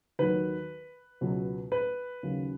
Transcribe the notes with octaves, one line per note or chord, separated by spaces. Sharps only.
D#2 D#3 F#3 B4
C#2 B2 F#3
B4
D#2 C#3 F#3